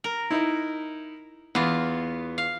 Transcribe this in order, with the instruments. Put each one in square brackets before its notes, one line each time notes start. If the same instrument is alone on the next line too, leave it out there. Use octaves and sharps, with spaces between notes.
[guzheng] A#4
[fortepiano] D#4 E4
[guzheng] E2 F4 [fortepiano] B3
[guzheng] F5